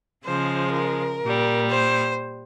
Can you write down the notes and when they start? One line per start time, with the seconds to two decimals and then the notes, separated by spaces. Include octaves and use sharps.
0.24 C#3 F3 G#3 C5
0.73 A#4
1.22 A#2 G3
1.70 C5